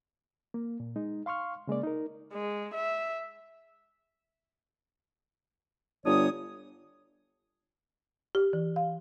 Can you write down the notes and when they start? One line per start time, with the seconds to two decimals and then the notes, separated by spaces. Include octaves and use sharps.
0.54 A#3
0.80 A#2
0.96 G#3 D#4
1.26 F5 C6 C#6 F6
1.67 C#3 G#3 A#3 D5
1.83 D#4 A#4
2.33 G#3
2.74 E5
6.05 G1 D4 C#5 D#6
8.35 G4
8.53 E3
8.76 F5